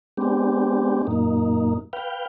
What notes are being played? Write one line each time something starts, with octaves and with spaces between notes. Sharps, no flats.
G#3 B3 C4 D4 G4
F#2 A#2 A#3 D#4
B4 F5 G5